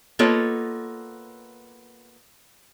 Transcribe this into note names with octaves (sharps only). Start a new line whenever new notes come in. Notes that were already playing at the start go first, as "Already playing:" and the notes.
A#3 B3 F4 A4 C#5 D#5